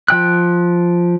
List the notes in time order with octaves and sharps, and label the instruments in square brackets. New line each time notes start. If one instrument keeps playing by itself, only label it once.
[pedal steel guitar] F3 G5 F#6